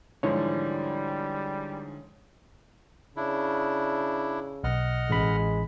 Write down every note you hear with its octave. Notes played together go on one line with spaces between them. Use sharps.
G#2 D3 E3 F3 G3 C#5
C#3 D4 E4
B1 D#5 F#5 F6
A1 G#3 B5